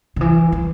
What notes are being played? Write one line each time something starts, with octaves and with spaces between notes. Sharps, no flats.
D3
E3
F3